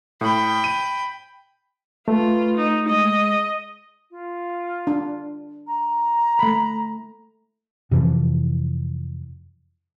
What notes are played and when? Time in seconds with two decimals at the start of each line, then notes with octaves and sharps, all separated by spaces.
0.21 A2 G5 B5
0.64 D#7
2.08 A3 F4 B4
2.56 D#4
2.88 G#3 D#5
4.10 F4
4.87 D4
5.67 A#5
6.39 A3 B5
7.91 F2 C3 E3 F3